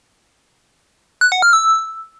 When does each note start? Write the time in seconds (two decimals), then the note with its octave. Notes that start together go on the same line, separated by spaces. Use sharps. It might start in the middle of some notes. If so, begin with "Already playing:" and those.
1.21 F#6
1.32 F#5
1.42 F6
1.53 E6